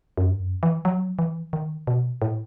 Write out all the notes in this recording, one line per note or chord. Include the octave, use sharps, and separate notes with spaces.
F#2
G2
F#2
E3
F#3
E3
D#3
B2
A2